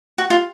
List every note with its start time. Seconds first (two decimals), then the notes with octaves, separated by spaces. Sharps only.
0.18 F#4
0.30 F4